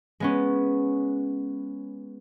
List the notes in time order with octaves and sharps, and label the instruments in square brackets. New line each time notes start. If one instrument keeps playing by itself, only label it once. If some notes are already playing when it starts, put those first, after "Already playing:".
[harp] G#3 B3 C#4